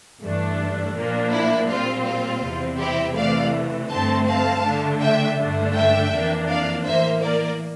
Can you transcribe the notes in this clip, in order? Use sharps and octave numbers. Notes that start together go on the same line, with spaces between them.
G2 E3 A3 D4
A#2 F3 A#3 D4
E4
A#2 G3 C4 F4
F4
E2 C3 G3 C4
E4 G4
C3 E3 A3 D5 F5
G2 D3 A3 C4 A5 C6
F5 A5
D3 A3 D4
E5 G5
G2 D3 A3 D4
E5 G5
F2 E3 A#3 D4
D5 F5
A2 E3 A#3 C5 E5
A#4 D5